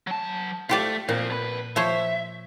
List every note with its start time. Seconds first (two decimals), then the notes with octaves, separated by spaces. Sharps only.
0.07 F#3 A5
0.69 A3 F4 G4 D5
1.09 A#2 F3 C4
1.30 F2 B4
1.76 F3 C5 C#5 E5